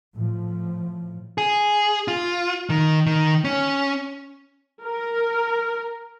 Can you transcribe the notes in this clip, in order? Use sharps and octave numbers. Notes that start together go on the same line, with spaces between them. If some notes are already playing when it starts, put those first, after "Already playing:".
A2 F3
G#4
F4
D#3
D#3
C#4
A#4